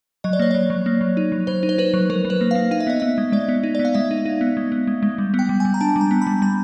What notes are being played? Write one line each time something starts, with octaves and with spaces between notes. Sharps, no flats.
F#3 D#5
D5
A#3 C#5
F#3 D5
F#3
A#3
F#3
D#4
F#3
F#3 C5
D#4
C5
D#4 B4
F#3
F#3 A#4
F#3
B4
A#3
A#3 F5
D#4 F5
E5
B3 D#5
B3 E5
G#3
G#3 D5
B3
D#4
B3 D5
F5
G#3 E5
D#4
D#4
B3
G#3
B3
G#3
G#3
G3
B3
G5
G3
G3 G#5
A#5
D4 A5
G3
A#5
B3
B5
G3
G3 A#5